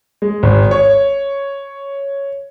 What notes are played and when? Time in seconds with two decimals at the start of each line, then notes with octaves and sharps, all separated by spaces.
0.22 G#3
0.43 G#1
0.71 C#5